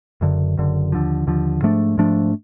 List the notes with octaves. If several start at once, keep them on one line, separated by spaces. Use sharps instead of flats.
F#1 F#2 D3
F#1 F#2 D3
D#2 D3 F3
D#2 D3 F3
G#2 F3 A3 D4
G#2 F3 A3 D4